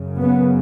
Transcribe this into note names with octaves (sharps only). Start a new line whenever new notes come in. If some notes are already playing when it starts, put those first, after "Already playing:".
Already playing: F#2 C#3
B3